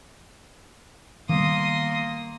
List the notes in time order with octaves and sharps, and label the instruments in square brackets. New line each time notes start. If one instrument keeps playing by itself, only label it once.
[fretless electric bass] D#3 G3 B3 [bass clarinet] A#3 [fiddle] C6 D#6